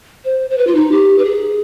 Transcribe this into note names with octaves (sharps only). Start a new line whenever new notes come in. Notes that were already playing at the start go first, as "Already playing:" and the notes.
C5
C5
B4
F4
D#4
G4
B4
G#4